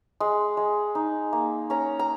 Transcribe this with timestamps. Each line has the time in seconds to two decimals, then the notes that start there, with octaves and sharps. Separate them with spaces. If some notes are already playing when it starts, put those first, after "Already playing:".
0.20 G#3
0.57 G#3
0.95 D#4
1.33 A#3
1.70 C#4 A#5
1.99 A#5